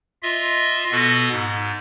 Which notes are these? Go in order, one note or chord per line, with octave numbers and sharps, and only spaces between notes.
F4 D#5 E5
B2 B3 F#4 A4
G#2